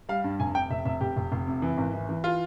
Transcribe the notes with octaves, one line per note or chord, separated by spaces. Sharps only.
G3 F5
G2
F1 G#5
C3 G5
F1 E5
F1 E5
F1 G4
F1
F1
C3
E3
G#1
E3
E3
F4